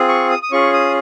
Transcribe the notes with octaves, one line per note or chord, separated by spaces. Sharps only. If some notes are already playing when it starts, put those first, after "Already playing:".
Already playing: C4 F4 G#4
C#6
D#6
D#6
C#4 F4 G#4 C#6
D#6